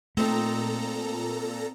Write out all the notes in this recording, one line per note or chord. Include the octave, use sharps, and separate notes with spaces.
A#2 A3 C4 D#4 A4 A#5